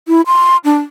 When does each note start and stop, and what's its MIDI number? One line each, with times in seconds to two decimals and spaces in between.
0.08 0.21 64
0.27 0.57 84
0.65 0.79 62